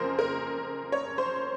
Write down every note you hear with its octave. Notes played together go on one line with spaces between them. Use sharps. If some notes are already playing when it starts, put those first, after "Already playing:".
Already playing: F2 C#3 F3 A#3 G#4 A#4 C5
A#4
C#5
C5